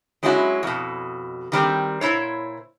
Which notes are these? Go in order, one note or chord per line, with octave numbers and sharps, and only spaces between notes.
F#3 G#3 C#4 D4 E4 F#4
F2 B2
D#3 G3 C4
A#2 E4 C5 C#5